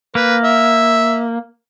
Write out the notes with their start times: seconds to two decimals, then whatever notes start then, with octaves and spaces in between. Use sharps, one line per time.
0.15 A#3 B4
0.43 E5